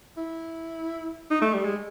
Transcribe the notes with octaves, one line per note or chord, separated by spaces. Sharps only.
E4
D#4
A3
G3
G#3